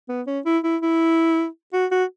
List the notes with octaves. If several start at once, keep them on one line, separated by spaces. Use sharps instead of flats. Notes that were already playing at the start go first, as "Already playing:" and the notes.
B3
C#4
E4
E4
E4
F#4
F#4